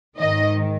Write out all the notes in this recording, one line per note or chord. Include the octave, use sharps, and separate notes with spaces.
G#2 D#3 D#5